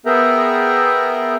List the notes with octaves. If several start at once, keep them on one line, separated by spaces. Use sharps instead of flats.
B3 G#4 A#4 E5 G5 A#5